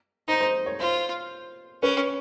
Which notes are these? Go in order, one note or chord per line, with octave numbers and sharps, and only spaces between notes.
D#4 C5
C5
C#5
F4 C5
C#4 B4